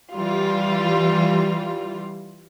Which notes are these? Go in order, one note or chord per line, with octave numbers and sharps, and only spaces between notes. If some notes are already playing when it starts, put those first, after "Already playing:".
E3 G3 F4